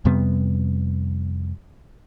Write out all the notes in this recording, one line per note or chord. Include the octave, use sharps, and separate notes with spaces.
F2 C3 G3 B3